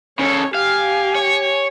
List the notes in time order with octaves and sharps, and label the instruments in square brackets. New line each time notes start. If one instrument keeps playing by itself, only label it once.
[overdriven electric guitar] C#3 A4 [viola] C#5
[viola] G4 G#5 [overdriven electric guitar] F5
[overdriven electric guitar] C#5